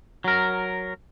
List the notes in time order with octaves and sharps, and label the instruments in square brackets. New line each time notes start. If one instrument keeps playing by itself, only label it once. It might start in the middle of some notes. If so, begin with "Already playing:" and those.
[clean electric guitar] F#3 A#4